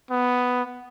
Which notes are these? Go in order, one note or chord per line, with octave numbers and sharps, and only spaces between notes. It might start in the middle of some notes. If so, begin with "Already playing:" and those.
B3